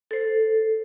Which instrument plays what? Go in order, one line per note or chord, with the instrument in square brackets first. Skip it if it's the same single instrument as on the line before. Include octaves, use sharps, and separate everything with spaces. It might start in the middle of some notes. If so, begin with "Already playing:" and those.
[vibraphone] A4 C5